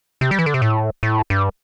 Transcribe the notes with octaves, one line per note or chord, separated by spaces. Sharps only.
C3
G3
E3
D3
C3
A2
A2
G2